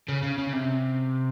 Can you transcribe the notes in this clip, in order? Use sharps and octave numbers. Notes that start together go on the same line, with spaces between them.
C#3
C#3
C#3
C3